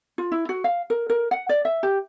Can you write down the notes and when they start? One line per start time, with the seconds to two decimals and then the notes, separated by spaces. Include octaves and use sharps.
0.18 F4
0.32 E4
0.49 F#4
0.64 F5
0.90 A#4
1.10 A#4
1.31 F#5
1.49 D5
1.65 E5
1.83 G4